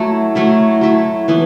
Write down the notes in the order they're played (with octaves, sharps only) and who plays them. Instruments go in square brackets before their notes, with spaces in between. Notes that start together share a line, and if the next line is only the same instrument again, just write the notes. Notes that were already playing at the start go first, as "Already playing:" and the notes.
Already playing: [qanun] F#3 A3 E4 A4
F#3 A3 E4 A4
F#3 A3 E4 A4
E3 B3 E4